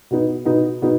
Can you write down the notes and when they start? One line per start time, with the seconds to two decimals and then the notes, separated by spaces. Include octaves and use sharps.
0.11 B2 B3 D#4
0.45 B2 B3 D#4
0.82 B2 B3 D#4